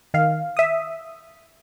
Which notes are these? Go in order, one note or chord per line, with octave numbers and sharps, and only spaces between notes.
D#3 F5
E5 D#6